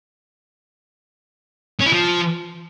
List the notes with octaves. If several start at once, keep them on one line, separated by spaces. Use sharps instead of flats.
C#4
E4
F3